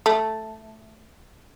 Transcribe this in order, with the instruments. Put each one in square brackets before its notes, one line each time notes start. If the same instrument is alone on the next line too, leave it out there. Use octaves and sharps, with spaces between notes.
[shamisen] A3